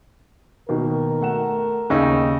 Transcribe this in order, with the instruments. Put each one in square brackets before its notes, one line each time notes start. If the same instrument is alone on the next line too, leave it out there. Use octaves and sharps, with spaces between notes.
[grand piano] B2 D#3 A#3 [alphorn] A#4
[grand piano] A3 F#5 E7
[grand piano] D#2 G5 E6 [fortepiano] C#3 D#4